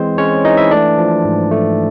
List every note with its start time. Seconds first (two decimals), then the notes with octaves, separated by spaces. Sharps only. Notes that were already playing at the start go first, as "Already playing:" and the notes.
Already playing: E3 G#3 C4 C5
0.18 G#3 C#4 C#5
0.45 E3 D#4 D#5
0.57 E4 E5
0.71 A3 D4 D5
0.98 F3
1.24 G#2
1.51 A3